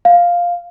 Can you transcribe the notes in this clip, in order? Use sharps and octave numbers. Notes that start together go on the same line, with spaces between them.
F5